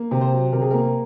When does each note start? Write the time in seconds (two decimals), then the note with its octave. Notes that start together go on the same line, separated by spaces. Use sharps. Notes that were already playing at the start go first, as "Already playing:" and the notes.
Already playing: A#3
0.11 C3
0.21 C5
0.32 F#3
0.52 C3 A#4
0.62 G#4
0.71 A#3 A#4